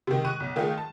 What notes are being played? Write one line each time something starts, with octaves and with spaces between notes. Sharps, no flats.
C3 D#3
C#6 F#6 D#7
B1
D#3 A3 F4 G#4
A5